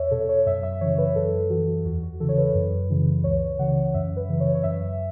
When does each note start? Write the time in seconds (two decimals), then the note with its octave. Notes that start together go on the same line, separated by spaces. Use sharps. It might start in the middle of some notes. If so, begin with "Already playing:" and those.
Already playing: E2 C#5 E5
0.11 B2 A4
0.29 C#5
0.46 F#2 E5
0.63 E5
0.81 C#3 E3 C#5
0.98 B4
1.16 F#2 A4
1.50 E3 F#4
1.85 E2 F#4
2.03 F#4
2.20 C#3 E3 A4
2.29 C#5
2.38 B4
2.55 F#2
2.90 C#3 E3
3.24 C#2 C#5
3.59 C#3 E3 F#5
3.94 F#2 E5
4.17 B4
4.29 C#3 E3
4.40 C#5
4.55 C#5
4.63 F#2 E5